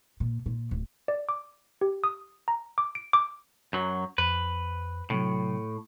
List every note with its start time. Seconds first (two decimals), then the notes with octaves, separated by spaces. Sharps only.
0.20 A#2
0.46 A#2
0.71 D1
1.08 D5
1.29 D6
1.81 G4
2.04 D#6
2.48 A#5
2.78 D6
2.95 D7
3.13 D6
3.73 F#2 F#3
4.18 F2 B4
5.10 A2 C3 F#3